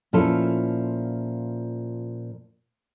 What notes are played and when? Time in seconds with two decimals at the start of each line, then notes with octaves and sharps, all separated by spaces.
0.13 A#2 F3 C#4 E4 F4 A4